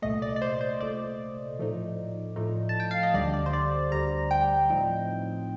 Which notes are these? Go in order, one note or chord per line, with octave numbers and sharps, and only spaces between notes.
C2 A#2 A3 D#5
D5
D5
C5
C5
C2 A#2 A3 D5
A2 F3 A3 D#4
A2 F3 A3 D#4
A5
G5
F5
D#5
D2 D3 G3 D5
D5
C5
D5
D2 D3 G3 A#5
G5
A2 F3 C4 D#4